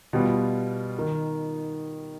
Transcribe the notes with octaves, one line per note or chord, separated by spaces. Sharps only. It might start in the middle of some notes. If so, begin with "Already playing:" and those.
B2 G3 B3 F4
D#3